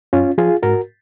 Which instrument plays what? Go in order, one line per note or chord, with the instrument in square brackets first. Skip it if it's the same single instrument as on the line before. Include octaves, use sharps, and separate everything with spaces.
[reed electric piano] F#2 C#4 F4
F3 F4 G#4
G#2 F#4 A#4